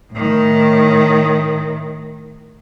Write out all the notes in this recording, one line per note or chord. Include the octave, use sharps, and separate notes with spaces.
A2 D#3